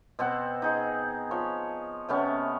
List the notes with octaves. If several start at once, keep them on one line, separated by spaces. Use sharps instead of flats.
B2 C4 F#5
D#4 G#4
F3 C#5
C3 A3 B3 C#4